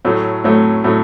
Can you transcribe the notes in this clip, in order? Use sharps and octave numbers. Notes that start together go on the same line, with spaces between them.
A2 F#3 A3
A2 F#3 A3
A2 F#3 A3